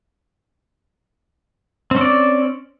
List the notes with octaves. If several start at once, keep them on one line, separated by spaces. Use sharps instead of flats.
C4 C#4 D5